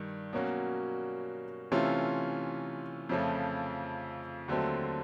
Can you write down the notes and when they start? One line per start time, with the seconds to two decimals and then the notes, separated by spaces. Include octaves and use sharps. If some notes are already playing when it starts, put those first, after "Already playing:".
Already playing: G2 D#3
0.33 B2 F#3 A#3 C#4 F#4
1.72 C3 E3 A3 C#4 F4
3.09 F2 C#3 F3 A3
4.48 D#2 D3 F#3 A3 C4